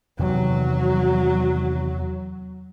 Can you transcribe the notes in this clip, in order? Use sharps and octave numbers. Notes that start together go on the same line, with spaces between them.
E2 C3 D#3 F#3